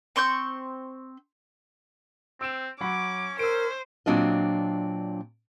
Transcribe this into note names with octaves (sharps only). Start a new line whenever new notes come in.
C4 C6 C#6 G6
C4 E6 D7 E7
F#3 C#4 F#5 B5 D6
A#4 C5 E6 D7
A#2 F#3 C4 D4 F4 D#5